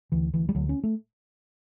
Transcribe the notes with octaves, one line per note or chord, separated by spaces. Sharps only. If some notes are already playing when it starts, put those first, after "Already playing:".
D2 E3
D2 E3
G3
D2 F#3
C#4
A3